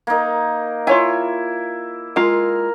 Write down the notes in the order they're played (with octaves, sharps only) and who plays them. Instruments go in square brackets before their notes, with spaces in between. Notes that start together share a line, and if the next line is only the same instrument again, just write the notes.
[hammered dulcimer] A#3 D#4
[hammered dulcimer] E4 [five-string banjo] F4 C#5 G#5
[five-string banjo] G#3 F4 [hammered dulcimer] A#4